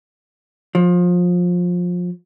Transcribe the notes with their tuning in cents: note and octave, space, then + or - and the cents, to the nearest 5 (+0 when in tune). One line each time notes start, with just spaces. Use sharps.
F3 +25